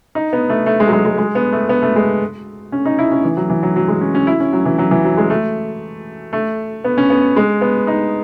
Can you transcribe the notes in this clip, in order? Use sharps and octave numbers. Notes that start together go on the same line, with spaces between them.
D#4
B3
A3
A3
G#3
F#3
G#3
G#3
G#3
B3
A3
B3
A3
G#3
C#4
D#4
E4
C#4
E3
F#3
E3
F#3
F#3
G#3
C#4
C#4
E4
C#4
F#3
E3
F#3
E3
F#3
G#3
A3
A3
B3
C#4
B3
G#3
B3
D#4